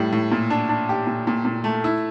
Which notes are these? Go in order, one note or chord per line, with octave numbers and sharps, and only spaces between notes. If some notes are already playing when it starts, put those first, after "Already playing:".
Already playing: A2 G3
A2
A#2
D4
D4
G4
A#2
A#2
A#2
A3
E4